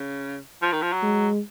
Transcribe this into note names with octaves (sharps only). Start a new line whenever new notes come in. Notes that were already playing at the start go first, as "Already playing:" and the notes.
Already playing: C#3
F3
D#3
F3
F#3
G#3